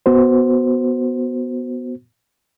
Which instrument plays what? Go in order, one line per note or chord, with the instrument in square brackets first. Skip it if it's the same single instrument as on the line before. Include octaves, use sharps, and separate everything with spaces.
[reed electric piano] B3 F#4 C5